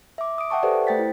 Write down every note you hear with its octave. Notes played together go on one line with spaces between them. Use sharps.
E5 D6
D#6 D7
E5 F#5 G5 A5 C#6
G4 A4 B4 C5 D5
A3 C5 G5 A6 B6
E4